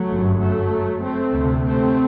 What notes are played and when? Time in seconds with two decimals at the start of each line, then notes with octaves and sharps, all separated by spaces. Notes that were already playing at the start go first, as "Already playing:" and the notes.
Already playing: F#3 A3
0.09 G1 F#2
0.40 F#3 A3
1.02 A3 C4
1.34 D2 C3
1.65 A3 C4